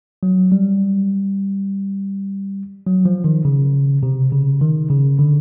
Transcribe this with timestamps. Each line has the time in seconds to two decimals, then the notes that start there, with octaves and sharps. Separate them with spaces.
0.23 F#3
0.52 G3
2.87 F#3
3.05 F3
3.24 D#3
3.45 C#3
4.03 C3
4.33 C#3
4.61 D#3
4.90 C#3
5.19 D3